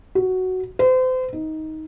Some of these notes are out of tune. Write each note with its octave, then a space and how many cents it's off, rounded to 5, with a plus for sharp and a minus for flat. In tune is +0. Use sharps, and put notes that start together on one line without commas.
F#4 +5
C5 -35
D#4 +15